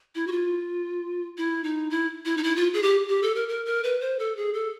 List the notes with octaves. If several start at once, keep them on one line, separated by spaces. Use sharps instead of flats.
E4
F#4
F4
E4
D#4
E4
E4
D#4
E4
F4
G#4
G4
G4
A4
A#4
A#4
A#4
B4
C5
A4
G#4
A4